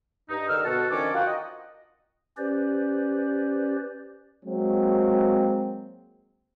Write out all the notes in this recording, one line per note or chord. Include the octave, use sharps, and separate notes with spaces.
G2 D#4
D3 D#3 D#5 E6 F6
B2 F#4 A4
D3 D#3 F3 C#4 A4 D6
F4 F#4 A#4 F#5 G5
D#5
C#4 G4 B4 C5 D5
F#3 G#3 A#3 C4